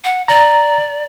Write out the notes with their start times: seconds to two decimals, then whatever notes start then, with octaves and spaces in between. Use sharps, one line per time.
0.04 F#5
0.28 D5 A#5